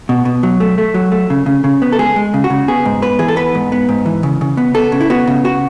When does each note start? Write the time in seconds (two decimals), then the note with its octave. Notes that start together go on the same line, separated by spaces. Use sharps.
0.09 B2
0.25 B2
0.43 F#3
0.60 A3
0.78 A3
0.94 F#3
1.12 A3
1.30 C#3
1.46 C#3
1.64 C#3
1.82 B3
1.93 A4
1.99 G#3 G#4
2.16 G#3
2.34 C#3
2.44 F#4
2.50 C#3
2.68 B3 G#4
2.85 G#2
3.02 B3 B4
3.19 E3 G#4
3.28 A4
3.36 B3 B4
3.55 G#2
3.72 B3
3.89 G#2
4.06 E3
4.23 C#3
4.41 C#3
4.57 B3
4.74 B3 A4
4.92 C#3
5.01 E4
5.10 B3 F#4
5.27 C#3
5.45 F#4